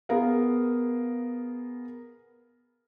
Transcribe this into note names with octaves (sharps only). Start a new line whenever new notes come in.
B3 G#4 A#4 F5